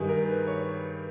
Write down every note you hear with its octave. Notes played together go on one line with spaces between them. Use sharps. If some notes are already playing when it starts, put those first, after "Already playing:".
Already playing: G2 D#3 G3 G#4
A#4
B4
C#5